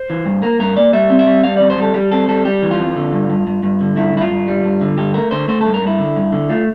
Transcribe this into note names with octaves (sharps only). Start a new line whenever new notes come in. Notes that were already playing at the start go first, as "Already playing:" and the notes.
Already playing: C5
E3
G2
A#3 A#4
G2 A#4
A#3 D5
G3 E5
C4
E5
G3
G3 F5
F2 D5
C5
G3 A4
G3 G4
C4 A4
G3 A4
G3 G4
E3
F4
F2
D3
G2
G2
G2
G2
D3
G2 E4
G2 E4
F4
G2
G3
G2
D3
G2 G4
A3 A#4
D3 C5
A3 C5
G2 A4
A#4
G2 E4
D3
G2
D3
A3 F4